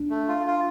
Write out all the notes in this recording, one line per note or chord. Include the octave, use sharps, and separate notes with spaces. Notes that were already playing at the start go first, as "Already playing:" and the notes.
Already playing: D4
A3
F4
F4